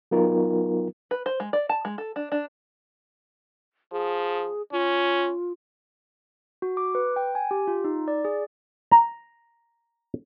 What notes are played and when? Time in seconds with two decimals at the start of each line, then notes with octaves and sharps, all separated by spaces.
0.11 F#3 B3 D#4 F4 A#4
1.11 B4
1.26 C5
1.40 G#3
1.53 D5
1.69 A5
1.85 G#3
1.98 A4
2.16 D4
2.32 D4
3.92 F3 G#4
4.72 C#4 F4
6.62 F#4
6.77 D6
6.95 B4
7.16 G5
7.35 G#5
7.51 G4
7.67 F4
7.84 D#4
8.08 D5
8.25 G#4
8.91 A#5